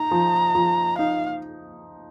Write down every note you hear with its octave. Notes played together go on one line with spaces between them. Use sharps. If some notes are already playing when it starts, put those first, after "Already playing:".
Already playing: D#4 A#5
F3
F3
D#4 F5